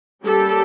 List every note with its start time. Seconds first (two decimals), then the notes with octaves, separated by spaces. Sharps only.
0.24 G3 A#3 C#4 G4 A4